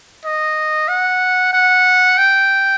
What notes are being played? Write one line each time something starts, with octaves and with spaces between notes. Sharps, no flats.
D#5
F#5
F#5
G5